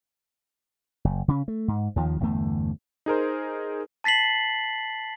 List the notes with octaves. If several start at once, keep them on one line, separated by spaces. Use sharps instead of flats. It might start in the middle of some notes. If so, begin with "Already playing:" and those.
F#1
C#3 C#4
A3
G#2
D#2 D#3 F3
G1 E2 D3 A3
D#4 G#4 A#4 C5
A5 A6 B6 C7 F#7